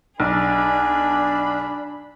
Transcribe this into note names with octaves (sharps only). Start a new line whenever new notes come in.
B1 D4 G#4 B5